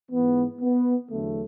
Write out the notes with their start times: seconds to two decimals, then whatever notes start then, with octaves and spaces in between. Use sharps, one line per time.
0.11 G#2 E3 B3
0.61 B3
1.11 E2 D3 F#3 A3